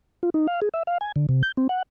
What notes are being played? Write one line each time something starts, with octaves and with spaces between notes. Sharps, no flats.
F4
D#4
F5
G#4
E5
F5
G#5
D3
C3
G6
C4
F#5